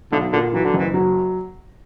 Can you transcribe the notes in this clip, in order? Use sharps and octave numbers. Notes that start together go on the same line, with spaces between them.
B1 D3
A#2 D3
E3 F#3
D3
F#1 E3
F#3